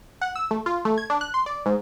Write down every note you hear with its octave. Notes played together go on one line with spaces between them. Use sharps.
F#5
E6
A3
F4
A3
G#6
D4
F#6
C6
D5
G#2